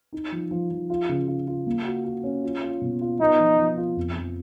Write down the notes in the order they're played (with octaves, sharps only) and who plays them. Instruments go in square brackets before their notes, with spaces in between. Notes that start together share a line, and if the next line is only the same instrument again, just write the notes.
[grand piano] D#4
F3
F3
F3
F4
C#3
F4
F4
A#3
F#4
F#4
C#4
F4
F4
B2
F4
[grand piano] B3 [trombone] D#4
[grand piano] F3
F3
F4
F2
F3